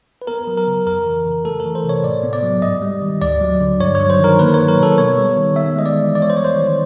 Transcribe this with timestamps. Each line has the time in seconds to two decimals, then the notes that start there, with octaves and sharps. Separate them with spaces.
0.22 B4
0.27 B3 A#4
0.47 F#3
0.57 A#4
0.67 C#3
0.87 F2 A#4
1.06 E3
1.26 C#3
1.45 A3 A4
1.60 A#4
1.65 E3
1.75 C5
1.84 C3
1.89 C#5
2.04 A2 D5
2.23 B3
2.33 D5
2.43 F#3
2.62 G#2 D#5
2.82 G3
3.02 D#3
3.21 D2 D5
3.41 F#3
3.61 D3
3.80 G2 C#5
3.95 C#5
4.00 F#3
4.10 C5
4.20 D#3 A#4
4.39 A#3 B4
4.54 F#3 C#5
4.68 A#4
4.78 B2 A4
4.98 B3 C#5
5.18 G3
5.37 D#3
5.56 B3 E5
5.76 G#3 D#5
5.86 D5
5.95 E3
6.15 B3 D5
6.22 C#5
6.30 C5
6.35 G3 C#5
6.44 C5
6.54 D#3